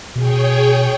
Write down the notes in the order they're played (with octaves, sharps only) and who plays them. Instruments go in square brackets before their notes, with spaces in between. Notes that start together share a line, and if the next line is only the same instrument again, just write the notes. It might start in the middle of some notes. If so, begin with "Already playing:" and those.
[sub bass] B2 [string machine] G#4 C#5 G5